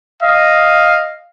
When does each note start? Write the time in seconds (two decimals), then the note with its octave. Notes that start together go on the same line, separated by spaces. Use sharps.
0.22 D#5 F5